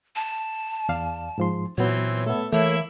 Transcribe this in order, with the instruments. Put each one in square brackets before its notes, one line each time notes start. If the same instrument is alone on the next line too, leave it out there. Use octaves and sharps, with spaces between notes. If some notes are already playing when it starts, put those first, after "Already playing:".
[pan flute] A5
[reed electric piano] E2 D5 F5
G#2 F3 C6
[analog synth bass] A#2 [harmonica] E3 C4 [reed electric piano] F#3 B3 [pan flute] C#5
[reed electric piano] A3 B3 [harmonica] A4 E5
[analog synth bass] E3 [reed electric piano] A3 [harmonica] A#3 E4 E5 [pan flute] C#5